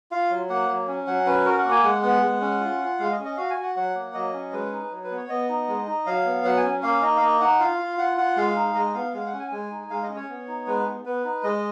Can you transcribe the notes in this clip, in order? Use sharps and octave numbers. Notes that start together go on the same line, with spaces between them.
F4 F5
F#3
A#3 F#5
F#3
C#4
F#3 F#5
C#4 B4
F#4 A#4
F#5
A#3
G#5
G#3 F#5
B3 F#5
G#3
C#4
F4
F4
G#3 F5
D#5
C#4
D#5
F#4 F5
G#5
F#4
F#5
F#3 F#5
A#3
F#3 D#5
C#4
G#3 B4
D#4
F#3
B4
B3
C#5
B3 D#5
D#4
G#3
D#4
F#3 F5
B3
F#3 F#5
G#5
C#4
A#3 F5
D#4 D#5
F5
A#3 D#5
D#4 F#5
F4 F5
F4
F4 F#5
F4 F#5
G#3 F5
D#4
G#3 D#5
B3 F5
G#3 F5
F#5
C#4
G#5
G#3 G#5
D#4
G#3 F5
D#5
C#4
C#5
B3
D#4
G#3 B4
B3
B3 B4
D#4
G#3 D#5